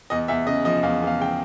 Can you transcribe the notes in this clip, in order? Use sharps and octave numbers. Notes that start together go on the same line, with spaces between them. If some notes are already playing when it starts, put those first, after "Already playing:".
E2 D#5
E2 E5
C#3 D#5
F3 D#5
E2 F5
E2 F5
C#3 G5